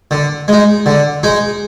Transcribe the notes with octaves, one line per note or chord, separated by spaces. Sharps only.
D3
G#3 D#4
D3
G#3 D#4